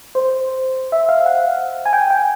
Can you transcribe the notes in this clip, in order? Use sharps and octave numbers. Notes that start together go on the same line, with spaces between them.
C5
E5
F5
F#5
G#5
G5
G5